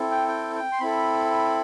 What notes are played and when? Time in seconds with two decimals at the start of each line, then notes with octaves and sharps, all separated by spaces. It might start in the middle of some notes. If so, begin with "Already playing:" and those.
Already playing: C4 E4 A4
0.11 G5
0.28 G5
0.55 G5
0.72 C6
0.80 C4 E4 A4 B5